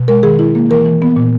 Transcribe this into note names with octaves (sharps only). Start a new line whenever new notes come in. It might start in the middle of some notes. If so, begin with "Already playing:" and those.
Already playing: B2
G#3 A#4
D#3 G#4
E4
A#3
E3 A#4
E3
B3
A#2